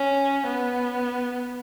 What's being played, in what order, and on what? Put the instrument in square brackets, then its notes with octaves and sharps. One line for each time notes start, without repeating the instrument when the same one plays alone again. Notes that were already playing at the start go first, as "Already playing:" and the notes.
Already playing: [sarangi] C#4
B3